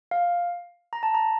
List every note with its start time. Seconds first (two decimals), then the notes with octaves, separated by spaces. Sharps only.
0.11 F5
0.93 A#5
1.03 A5
1.14 A#5